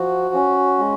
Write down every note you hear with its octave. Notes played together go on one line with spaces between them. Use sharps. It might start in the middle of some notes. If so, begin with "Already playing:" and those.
Already playing: F3 F#4
C#4
G#3